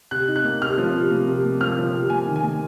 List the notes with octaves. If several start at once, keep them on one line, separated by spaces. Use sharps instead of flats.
C3 F#6
D#4
F#6
A#3
C3 F6
F3
C3
A#3
C3
A#3
F3 F6
F3
C3
A#3 G#5
D#3
G#5
A#3